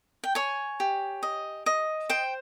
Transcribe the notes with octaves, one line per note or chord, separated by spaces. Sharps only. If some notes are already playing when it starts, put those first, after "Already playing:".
G5
C#5 G#5
G4
D#5
D#5
C5 G5